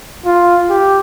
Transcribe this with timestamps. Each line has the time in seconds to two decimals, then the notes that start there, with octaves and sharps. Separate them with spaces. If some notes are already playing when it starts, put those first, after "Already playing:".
0.25 F4
0.69 G4